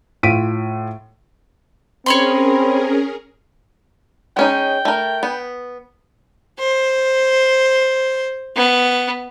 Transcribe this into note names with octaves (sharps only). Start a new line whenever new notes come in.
A2 F4 B6 D7 D#7
C4 C#4 G#4 A#4 C#5 B5 C6
G#3 C#4 D#4 G5
A3 A#4
B3
C5
B3